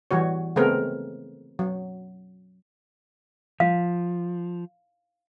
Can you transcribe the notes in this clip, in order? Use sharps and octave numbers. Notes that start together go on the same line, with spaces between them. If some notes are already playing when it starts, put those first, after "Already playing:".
E3 G3 F#4 C#5
C#3 G#3 A3 B3 C4 A#4
F#3
F3 F5